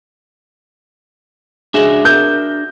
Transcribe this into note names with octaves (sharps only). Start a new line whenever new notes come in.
C#3 G#3 D4 F#4 E5
A#4 G6